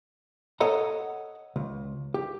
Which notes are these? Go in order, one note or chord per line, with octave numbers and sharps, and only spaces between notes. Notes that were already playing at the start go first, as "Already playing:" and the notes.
A4 C#5 D#5 F#5 A#5
C#2
G4